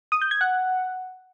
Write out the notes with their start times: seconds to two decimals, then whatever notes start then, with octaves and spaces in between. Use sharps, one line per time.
0.12 D#6
0.22 G6
0.31 G#6
0.41 F#5